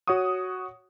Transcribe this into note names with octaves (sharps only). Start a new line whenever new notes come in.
F#4 C#5 F#5 C#6 D#6